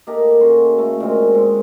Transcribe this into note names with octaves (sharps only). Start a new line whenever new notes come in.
A#3 D#4 G4 A4
C#3 F#4 C6
A3
A#2 D#3 G#3 C4
G#2